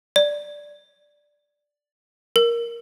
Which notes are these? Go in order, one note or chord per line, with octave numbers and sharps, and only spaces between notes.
D5
A#4